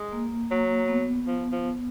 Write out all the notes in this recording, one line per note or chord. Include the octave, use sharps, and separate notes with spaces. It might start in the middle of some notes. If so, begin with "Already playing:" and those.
Already playing: G#3
A#3
F#3 A#3
B3
F3
F3